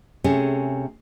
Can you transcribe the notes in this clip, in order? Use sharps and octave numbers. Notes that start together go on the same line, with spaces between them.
C3 A3 C#4 G#4